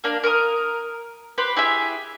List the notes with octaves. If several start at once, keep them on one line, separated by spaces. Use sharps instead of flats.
A#3 D4
A#4 D#6
G4 B4 C5
E4 G4 G#4 E5